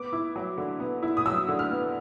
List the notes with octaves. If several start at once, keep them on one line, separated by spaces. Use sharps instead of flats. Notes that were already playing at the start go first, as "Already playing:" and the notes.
Already playing: B3 D6
E4
F#3
D3
B3
E4
D#6
F#3 E6
D3
F6
B3